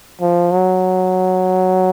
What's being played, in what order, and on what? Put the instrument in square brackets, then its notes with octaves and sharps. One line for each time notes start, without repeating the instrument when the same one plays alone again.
[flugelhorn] F3
F#3